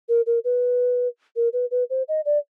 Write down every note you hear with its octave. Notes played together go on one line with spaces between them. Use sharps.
A#4
A#4
B4
A#4
B4
B4
C5
D#5
D5